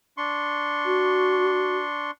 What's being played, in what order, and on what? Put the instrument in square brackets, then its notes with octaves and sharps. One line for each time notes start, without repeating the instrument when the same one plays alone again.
[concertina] D4 C6 C#6
[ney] F#4